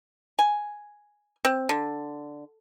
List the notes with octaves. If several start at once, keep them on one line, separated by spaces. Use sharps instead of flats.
G#5
C4
D3